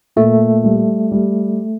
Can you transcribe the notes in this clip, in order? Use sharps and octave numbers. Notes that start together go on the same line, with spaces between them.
A#2 A3
G3
G3